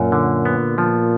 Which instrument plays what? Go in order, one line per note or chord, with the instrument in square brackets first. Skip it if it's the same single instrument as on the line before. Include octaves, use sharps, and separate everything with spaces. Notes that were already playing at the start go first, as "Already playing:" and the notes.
Already playing: [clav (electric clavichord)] F#2 [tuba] A#2
[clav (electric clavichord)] D3
B3
[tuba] A#2 [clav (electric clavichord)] F3